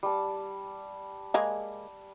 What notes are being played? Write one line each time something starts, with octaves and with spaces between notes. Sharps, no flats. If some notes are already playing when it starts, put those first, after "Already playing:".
G3 A5
G#3 A#3 G#4